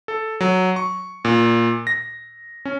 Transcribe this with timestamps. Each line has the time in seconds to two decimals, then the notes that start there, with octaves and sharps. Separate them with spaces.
0.08 A4
0.41 F#3
0.76 C#6
1.25 A#2
1.87 A#6
2.65 C#4